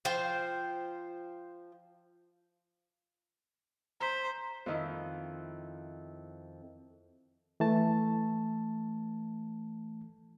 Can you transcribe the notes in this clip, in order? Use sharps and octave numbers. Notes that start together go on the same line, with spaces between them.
F3 C5 G5
C5 A#5 B6
F2 D#3 E4
E3 A3 A5